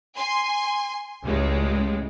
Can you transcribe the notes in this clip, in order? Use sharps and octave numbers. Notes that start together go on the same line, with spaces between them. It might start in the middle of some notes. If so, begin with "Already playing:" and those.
G#5 C6
C#2 A2 C#3 G3 G#3